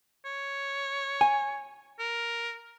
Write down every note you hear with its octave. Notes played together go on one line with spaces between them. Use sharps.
C#5
G#5
A#4